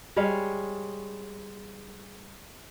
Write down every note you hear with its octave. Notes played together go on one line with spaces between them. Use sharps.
G3 G#3 C#5 F5